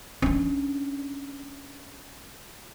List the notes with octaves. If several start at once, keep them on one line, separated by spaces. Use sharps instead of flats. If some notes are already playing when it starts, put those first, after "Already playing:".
C#4 D4